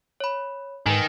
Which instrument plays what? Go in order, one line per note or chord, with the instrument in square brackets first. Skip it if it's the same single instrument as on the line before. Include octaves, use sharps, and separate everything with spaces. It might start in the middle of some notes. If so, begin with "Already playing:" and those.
[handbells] C#5 B5
[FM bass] G#2 [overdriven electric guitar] D#3 [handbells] B4 G#5